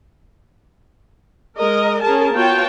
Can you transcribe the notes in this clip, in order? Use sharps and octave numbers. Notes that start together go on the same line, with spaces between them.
G#3 A#4 D#5
C#4 G#4 A#4 A5
B3 F4 F#4 C#5 G5 A5